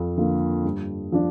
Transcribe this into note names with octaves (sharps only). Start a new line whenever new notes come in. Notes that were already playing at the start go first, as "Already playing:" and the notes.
Already playing: F2
D3 F3 A#3 F4
G2
F3 D4